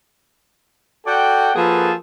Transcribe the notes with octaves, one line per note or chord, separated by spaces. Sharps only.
F#4 A4 D5 F#5 G5
F3 A#3 F#4 G#4 A4 B4